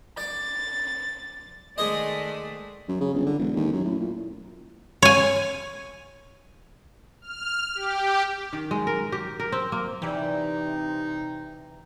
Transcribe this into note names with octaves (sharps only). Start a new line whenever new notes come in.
D5 D6 A6
D#3 G#3 A3 G#4 C5 D5 D#5
F#2
C#3
G1
D3
E1
D#2
F#2
A2
A#2
C#5 G#5
F6
G4
D#3
G#3
A#4
G4
A#4
C4
A#3
C3 E3 D#4 G4 D5